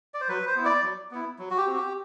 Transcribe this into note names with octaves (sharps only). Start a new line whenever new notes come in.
D5
C5
F#3 B4
C5
B3 E4
D5
F#3
B3 E4
F#3
F#4
G4
C4 F#4
G4